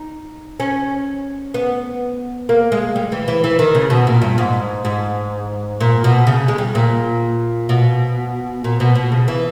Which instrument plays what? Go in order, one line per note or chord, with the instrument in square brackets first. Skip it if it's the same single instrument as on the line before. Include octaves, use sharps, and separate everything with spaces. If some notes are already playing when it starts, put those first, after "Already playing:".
Already playing: [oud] D#4
C#4
B3
A#3
G#3
G3
E3
E3
E3
D#3
C#3
B2
A#2
G2
G#2
G#2
A#2
B2
C#3
G#3
G3
A#2
B2
A#2
B2
B2
C#3
E3